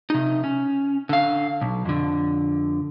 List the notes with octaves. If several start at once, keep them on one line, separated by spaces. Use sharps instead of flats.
C3 D#4
C#4
D3 F5
B1
F2 D3